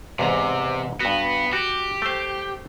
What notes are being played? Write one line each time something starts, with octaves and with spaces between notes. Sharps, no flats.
E2 G#2 C3 A#5
G2 B3 F#4
F#4 G4
A3 C5